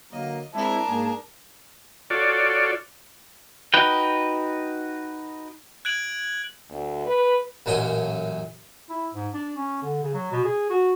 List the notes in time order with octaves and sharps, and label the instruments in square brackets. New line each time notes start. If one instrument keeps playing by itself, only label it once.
[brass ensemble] D3 F#3 A#3 [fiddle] D#5
[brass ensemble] G#3 C4 E4 [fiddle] D4 A#4 [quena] A5
[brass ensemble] G#2 A#3 G#4
[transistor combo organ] F4 F#4 A4 C#5 D5
[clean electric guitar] D#4 F#4 B4 G5
[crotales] F#6 G#6 D7 F#7
[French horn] D2
B4
[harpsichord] A1 F#2 A#2 F#3 D#5
[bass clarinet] E4
G#2
D4
C#4
D3
C#3
F#3
B2
G#4
F#4